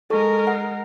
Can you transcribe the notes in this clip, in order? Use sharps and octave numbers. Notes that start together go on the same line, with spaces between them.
G#3 A4 A#4 C#6
F#5